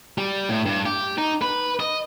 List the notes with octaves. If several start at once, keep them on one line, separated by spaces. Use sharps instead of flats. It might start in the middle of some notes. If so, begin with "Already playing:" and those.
G3
A2
G2
G4
D#4
B4
D#5